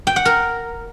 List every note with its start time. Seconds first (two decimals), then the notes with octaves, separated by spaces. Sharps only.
0.07 G5
0.16 F#5
0.25 A#4